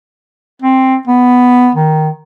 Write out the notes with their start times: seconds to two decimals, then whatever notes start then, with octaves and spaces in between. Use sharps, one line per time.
0.62 C4
1.07 B3
1.75 D#3